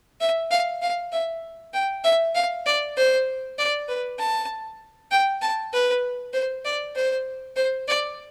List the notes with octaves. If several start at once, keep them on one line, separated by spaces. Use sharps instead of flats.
E5
F5
F5
E5
G5
E5
F5
D5
C5
D5
B4
A5
G5
A5
B4
C5
D5
C5
C5
D5